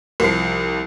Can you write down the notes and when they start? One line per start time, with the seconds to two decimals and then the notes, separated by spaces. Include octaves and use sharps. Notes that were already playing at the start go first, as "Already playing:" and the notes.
0.20 C2 F3 C7